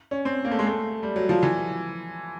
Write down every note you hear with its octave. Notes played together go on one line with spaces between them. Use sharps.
C#4
C4
A#3
A3
G#3
A3
G3
F#3
F3
E3